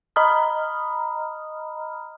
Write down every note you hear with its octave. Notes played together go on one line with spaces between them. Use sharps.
D#5 A#5 B5 D#6 F6